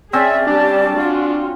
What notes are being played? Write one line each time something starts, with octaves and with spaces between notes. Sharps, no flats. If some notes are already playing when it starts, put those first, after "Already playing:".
C4 C#4 G#4 D5 E5
G3 D4 G4 A5
F4 F#4